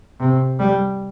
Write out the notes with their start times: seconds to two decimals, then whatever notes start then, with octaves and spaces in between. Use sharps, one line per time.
0.20 C3
0.59 G3